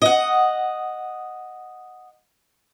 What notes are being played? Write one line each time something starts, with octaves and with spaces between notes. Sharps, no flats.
D#5 F#5